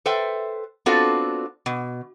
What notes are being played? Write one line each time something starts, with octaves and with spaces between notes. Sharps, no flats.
A4 B4 C5 E5 G5
B3 C4 D4 F4 F#4 A4
B2